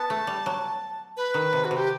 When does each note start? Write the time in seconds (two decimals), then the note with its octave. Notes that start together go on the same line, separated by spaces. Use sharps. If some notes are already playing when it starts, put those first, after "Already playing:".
Already playing: B3 A5
0.10 A3
0.27 G3
0.46 F#3
1.17 B4
1.34 D#3
1.53 C3
1.65 F#4
1.71 C3
1.76 G4